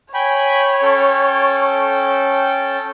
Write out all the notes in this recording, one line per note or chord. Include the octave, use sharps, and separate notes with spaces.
C#5 G5 G#5 B5
C#4 A4 G5